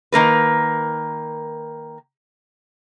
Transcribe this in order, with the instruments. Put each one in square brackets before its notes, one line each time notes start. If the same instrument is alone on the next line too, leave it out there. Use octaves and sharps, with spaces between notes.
[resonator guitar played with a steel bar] D#3 A#3 A#4 B4